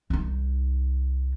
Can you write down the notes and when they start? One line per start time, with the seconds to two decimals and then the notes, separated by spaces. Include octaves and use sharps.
0.10 C2 D#4